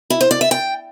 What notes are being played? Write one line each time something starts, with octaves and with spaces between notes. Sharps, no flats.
E4
C5
D5
E5
G5